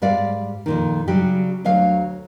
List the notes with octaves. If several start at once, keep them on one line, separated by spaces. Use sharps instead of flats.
G#2 G3 D5 F5
F2 A#2 D#3
C#3 F#3 G3 G4
D2 F#3 C#5 F5